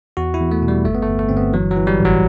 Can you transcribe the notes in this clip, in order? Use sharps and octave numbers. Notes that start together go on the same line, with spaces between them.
E2 F#4
E4
E2
A3
B2
G3
G1 A3
B3
A3
G1
A3
G1 C4
B3
E3 F#3
F#3
E3
G3
A1
F#3